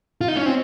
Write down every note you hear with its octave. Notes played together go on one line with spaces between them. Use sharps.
F4
D#4
C#4
C4